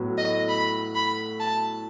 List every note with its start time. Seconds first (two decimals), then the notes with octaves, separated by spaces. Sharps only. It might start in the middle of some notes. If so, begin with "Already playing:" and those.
Already playing: A2 F#3 B3
0.18 D#5
0.49 B5
0.95 B5
1.40 A5